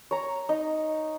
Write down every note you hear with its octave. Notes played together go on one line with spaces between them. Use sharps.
C#5 A#5
D#4